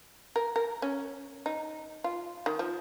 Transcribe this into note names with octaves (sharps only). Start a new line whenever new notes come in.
A#4
A#4
C#4
D#4
F4
D#3
F3